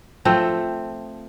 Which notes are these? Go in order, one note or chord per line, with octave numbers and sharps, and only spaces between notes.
F3 A3 C4